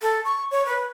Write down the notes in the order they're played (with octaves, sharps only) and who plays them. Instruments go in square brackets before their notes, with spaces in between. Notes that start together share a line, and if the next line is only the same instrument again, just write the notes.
[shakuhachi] A4
C#6
C#5
B4